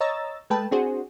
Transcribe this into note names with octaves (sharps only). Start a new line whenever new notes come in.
C#5 D#5 A#5 E6 A6
G#3 A3 B4 G5 A5
C4 D4 F#4 G#4 C5